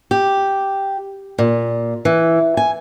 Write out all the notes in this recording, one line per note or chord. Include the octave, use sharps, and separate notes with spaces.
G4
A#2
E3
G#5